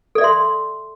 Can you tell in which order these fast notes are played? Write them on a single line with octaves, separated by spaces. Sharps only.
A4 D5 E5 C6